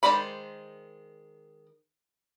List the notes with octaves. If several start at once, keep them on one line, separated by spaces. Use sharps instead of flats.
D#3 G#3 C5 D5 B5